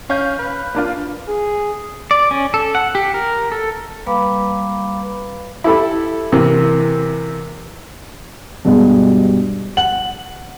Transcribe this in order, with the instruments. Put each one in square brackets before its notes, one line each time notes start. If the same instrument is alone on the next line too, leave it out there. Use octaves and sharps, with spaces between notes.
[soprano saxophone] C#4 [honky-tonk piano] F5 G6
[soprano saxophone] B4
[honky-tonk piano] A#3 D4 F4
[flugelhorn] G#4
[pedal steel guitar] D5
C#4
A4
F#5
G4
A#4
A4
[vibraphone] G3 A#3 B4 F5 B5 D6
[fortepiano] E4 G4 A4 B5
C3 E3 A#3
[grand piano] G2 B2 G3 G#3
F#5 F#7